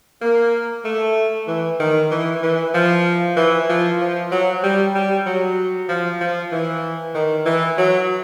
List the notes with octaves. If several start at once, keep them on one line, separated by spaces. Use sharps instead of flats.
A#3
A3
E3
D#3
E3
E3
F3
E3
F3
F3
F#3
G3
G3
F#3
F3
F3
E3
D#3
E3
F#3